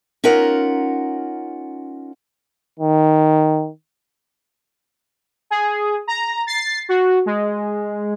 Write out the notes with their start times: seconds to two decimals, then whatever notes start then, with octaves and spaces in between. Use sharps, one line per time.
0.24 C#4 D#4 F4 A#4 F#5
2.79 D#3
5.50 G#4
6.07 A#5
6.47 A6 C7
6.89 F#4
7.26 G#3